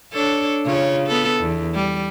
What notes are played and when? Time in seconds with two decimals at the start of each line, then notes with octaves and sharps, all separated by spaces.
0.13 D4 A4 C#5
0.66 C#3 F4 C#5
1.07 B3 A4
1.41 E2
1.74 G3